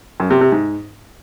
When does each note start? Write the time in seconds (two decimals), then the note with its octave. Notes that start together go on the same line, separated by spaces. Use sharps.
0.20 F#2
0.30 C3
0.41 C3
0.52 G#2